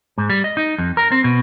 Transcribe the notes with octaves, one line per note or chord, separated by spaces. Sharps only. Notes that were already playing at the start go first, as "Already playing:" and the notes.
G#2
G3
D#5
D#4
F2
A#4
C4
B2